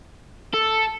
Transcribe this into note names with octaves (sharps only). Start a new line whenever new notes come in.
A4